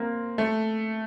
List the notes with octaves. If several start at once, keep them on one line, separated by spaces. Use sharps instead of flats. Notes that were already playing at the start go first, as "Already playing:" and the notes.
Already playing: A#3 C4
A3